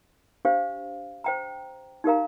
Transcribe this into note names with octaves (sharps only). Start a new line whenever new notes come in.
D4 G4 C5 F5
C5 G5 A#5
D#4 G4 A#4 F5 A#5